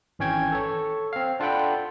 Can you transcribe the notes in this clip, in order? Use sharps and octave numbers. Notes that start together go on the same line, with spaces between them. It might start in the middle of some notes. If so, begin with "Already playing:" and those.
G#1 E3 C#4 C#5 G5 G#6
A4 C#5
C4 F5
D4 F4 A4 F#5 G5 B5